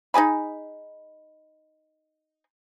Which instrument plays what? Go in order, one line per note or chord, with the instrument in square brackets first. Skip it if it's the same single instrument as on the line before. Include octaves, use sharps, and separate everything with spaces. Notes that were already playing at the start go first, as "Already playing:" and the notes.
[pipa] D#4 G#4 G#5 B5